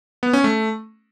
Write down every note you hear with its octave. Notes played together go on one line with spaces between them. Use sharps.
B3
C#4
A3